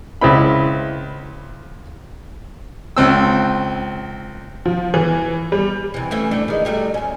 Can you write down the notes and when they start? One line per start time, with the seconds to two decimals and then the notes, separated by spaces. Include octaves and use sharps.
0.21 C#2 C4 E4 B5
2.97 C#2 C4 E6
4.65 F3
4.94 E3
5.52 G3
5.94 C3 E3
6.11 E3 A3 C#4
6.31 G3 A3 D4
6.48 D#3 G#3
6.65 F#3 G3 A3
6.94 F#2 C#4